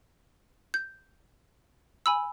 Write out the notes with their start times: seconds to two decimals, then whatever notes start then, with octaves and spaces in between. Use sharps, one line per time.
0.74 G6
2.06 G#5 B5 E6